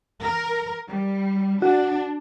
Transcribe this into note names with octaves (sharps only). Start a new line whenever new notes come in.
A#4
G3
D4 F#4